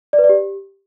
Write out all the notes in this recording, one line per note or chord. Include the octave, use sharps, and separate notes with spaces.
D5
B4
D5
G4